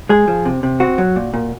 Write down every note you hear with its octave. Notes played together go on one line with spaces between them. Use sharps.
G#3 G#4
F3
C3
C3
C4 F#4
F#3
A#2
A#2